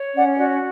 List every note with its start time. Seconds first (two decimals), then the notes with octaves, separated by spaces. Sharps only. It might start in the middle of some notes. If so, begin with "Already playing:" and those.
Already playing: C#5
0.15 C#4 D5 F#5
0.38 F#4 D5